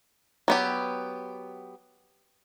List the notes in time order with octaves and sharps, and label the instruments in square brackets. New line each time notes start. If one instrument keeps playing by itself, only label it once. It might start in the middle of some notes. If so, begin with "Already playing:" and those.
[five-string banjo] F#3 B3 G4